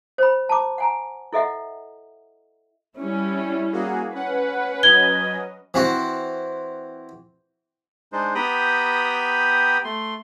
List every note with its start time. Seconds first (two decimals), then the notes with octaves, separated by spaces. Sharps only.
0.18 C5 B5
0.49 A5 A#5 D6
0.78 F#5 G#5 A#5
1.33 E4 A4 D#5 E5 F#5
2.97 G3 C#4 E4
3.72 A#3 F#4 G#4
4.14 C#4 B4 F#5
4.83 F#3 C#4 D#5 G#6 G7
5.74 E3 C4 F#4
8.12 G#3 D4 D#4 C5
8.35 B3 G4 G5 A#5 B5 D#6
9.85 A3 C6